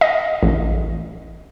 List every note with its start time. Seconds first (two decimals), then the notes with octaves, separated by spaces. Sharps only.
0.01 D#5
0.43 A1